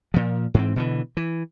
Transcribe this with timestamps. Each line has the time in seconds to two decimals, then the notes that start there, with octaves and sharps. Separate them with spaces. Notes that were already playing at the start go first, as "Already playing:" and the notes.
0.14 A#2 F3
0.54 G#2 E3 C4
0.76 B2 D3 E3
1.17 E3